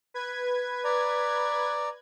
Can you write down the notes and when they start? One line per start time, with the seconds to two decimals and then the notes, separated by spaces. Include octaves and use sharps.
0.14 B4 G#6
0.84 D5 A#5